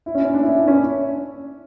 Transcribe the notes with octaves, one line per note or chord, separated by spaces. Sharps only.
E4
C#4
C#4
D4
E4
D4
C#4